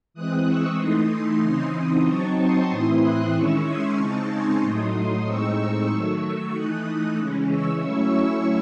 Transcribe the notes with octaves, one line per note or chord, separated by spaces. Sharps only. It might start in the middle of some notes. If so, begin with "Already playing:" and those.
E3 G#3 C4 D#6 F#6
C#6 E6
E3 A3 D#4 C6 D#6
C#3 E3 C4 D#4
F#3 C4 D#4 A5 C#6
C6 D#6
A2 E3 C4 E4
D#6 F#6
D#3 G#3 C#4 E4 C#6 E6
C6 D#6
C#3 G#3 C4 D#4 A5 C#6
G#5 C6
A2 F#3 A3 D#4 C6 D#6
A2 G#3 C4 D#4 C#6 E6
C#6 E6
D#3 F#3 A3
C#6 E6
E3 A3 D#4 D#6 F#6
C#3 E3 G#3 C#4
C#6 E6
F#3 A3 C#4 E4 C#6 E6